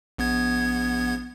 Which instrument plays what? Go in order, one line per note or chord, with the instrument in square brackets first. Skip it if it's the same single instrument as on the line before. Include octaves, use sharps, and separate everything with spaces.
[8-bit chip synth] A#1 B3 G#6